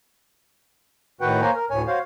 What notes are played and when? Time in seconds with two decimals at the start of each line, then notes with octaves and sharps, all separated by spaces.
1.21 A2 D#3 F#4 B4 F#5 G5
1.41 A#3 C5 C#5 G#5 A#5
1.56 A#4
1.71 D2 A2 C#5 G#5
1.87 F#4 C5 C#5 F5